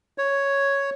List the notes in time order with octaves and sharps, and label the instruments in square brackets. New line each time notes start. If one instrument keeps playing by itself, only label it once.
[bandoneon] C#5